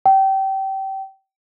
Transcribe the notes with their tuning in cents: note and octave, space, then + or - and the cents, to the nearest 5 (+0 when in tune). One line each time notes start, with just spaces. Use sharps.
G5 -25